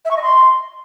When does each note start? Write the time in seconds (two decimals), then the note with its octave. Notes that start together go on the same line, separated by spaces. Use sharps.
0.05 E5
0.11 C#6
0.17 D#5
0.22 C6